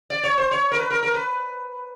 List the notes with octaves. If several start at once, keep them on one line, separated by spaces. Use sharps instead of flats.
D5
C#5
C5
C#5
A#4
B4
A#4
A#4
B4